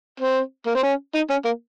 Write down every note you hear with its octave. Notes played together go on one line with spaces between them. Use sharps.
C4
A#3
C4
C#4
D#4
C#4
A#3